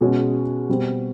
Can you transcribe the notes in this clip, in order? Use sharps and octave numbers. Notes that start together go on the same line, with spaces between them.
B2 G#3 C#4 F#4 G#4
B2 G3 C4